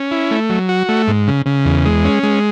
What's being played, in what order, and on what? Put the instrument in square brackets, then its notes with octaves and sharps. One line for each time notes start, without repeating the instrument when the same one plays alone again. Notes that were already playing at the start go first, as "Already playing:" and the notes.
Already playing: [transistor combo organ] C#4
E4
A3
F#3
F#4
A3
G#2
C#3
C#3
E2
G#3
C#4
G#3